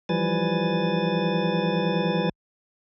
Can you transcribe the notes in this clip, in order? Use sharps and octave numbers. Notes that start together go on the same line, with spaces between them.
E3 F3 G3 B4 G#5 A6